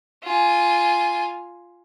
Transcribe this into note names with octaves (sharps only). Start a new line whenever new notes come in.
F4 G#5